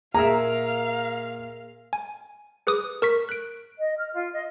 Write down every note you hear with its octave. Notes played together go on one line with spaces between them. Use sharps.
A#2 G#4 A#4 E5 F5 A#5
G#5
G#4 B4 D6 D#6
A#4 C#6 B6
F#6 D7
D#5
F6
F4
D#5